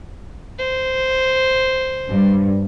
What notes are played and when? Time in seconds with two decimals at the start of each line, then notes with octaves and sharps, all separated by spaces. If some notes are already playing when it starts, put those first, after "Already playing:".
0.59 C5
2.10 G2